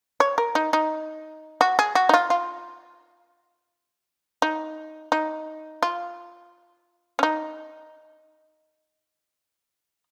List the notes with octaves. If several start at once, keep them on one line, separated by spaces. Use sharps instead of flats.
C#5
A#4
D#4
D#4
F#4
G#4
F#4
D#4
F4
F4
D#4
D#4
F4
C#4
D#4